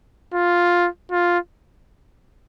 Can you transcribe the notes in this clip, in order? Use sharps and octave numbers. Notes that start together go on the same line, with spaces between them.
F4
F4